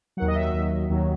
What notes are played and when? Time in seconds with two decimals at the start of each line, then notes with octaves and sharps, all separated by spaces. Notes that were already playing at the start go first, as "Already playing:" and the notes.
0.17 D#2 D#3 F#3 F#5
0.28 D#5
0.35 E5
0.54 D#2 D#3 F#3
0.90 D#2 D#3 F#3